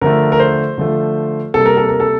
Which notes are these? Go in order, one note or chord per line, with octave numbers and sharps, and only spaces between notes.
D3 F3 A3 A#4
A#4
C5
D3 F3 A3
C3 G3 A#3 A4
A#4
A4
A#4
A4